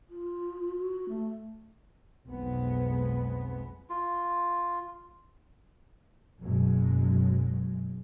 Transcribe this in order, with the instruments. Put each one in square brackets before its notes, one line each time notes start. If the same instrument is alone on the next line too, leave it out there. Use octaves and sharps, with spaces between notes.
[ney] F4
F#4
A3
[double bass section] B1 F2 G#3 B3
[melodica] F4
[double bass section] F#1 F#2 B2 F#3 G#3